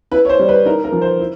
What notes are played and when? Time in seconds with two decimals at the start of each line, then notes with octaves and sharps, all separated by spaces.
0.12 E4 B4
0.25 C#5
0.29 C5
0.39 G3
0.49 B4
0.65 D#4 A#4
0.84 A#4
0.92 F3
1.02 C5
1.19 E4